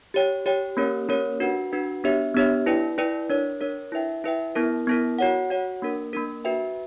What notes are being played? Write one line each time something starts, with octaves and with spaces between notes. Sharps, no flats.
G4 C#5 G5
G4 C#5 G5
A#3 C#4 G4 A#4 C#5
A#3 C#4 G4 A#4 C#5
D4 F#4 B4 F#5
D4 F#4 B4 F#5
B3 D4 G4 C#5 E5
B3 D4 G4 C#5 E5
E4 B4 D5 G5
E4 B4 D5 G5
D4 A#4 C#5
D4 A#4 C#5
E4 B4 E5 G5
E4 B4 E5 G5
B3 E4 A#4
B3 E4 A#4
F#4 C#5 F#5
F#4 C#5 F#5
A#3 D4 A#4
A#3 D4 A#4
F#4 B4 E5 G5